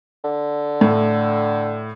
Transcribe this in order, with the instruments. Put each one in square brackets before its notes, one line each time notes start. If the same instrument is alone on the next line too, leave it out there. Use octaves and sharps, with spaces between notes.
[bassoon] D3
[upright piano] A2